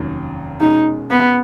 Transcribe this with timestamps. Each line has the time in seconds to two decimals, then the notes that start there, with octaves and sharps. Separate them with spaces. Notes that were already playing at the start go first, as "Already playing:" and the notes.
Already playing: F1 D#2 D#3 F#3 C#4
0.60 B2 G#3 C#4 D#4
1.11 B3